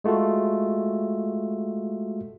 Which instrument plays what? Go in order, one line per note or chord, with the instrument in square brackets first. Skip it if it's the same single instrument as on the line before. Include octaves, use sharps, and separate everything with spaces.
[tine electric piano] G#3 A3 F4 F#4 A4